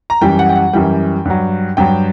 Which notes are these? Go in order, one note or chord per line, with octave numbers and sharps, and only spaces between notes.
A#5
F#2 E3 G3 G5
F#5
G5
F#5
F#2 E3 G3 G5
G2 F#3
G2 F#3 G5